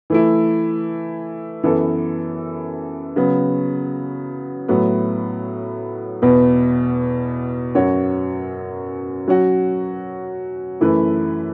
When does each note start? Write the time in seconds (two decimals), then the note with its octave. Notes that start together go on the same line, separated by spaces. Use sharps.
0.10 E3 A3 E4
1.63 F#2 E3 B3 A4
3.16 C#3 F#3 B3
4.68 A2 F#3 B3 F#4
6.22 E2 B2 B3
7.75 F#2 F#3 C#4 F#4 C#5
9.28 F#3 C#4 F#4
10.80 F#2 E3 A3 E4 B4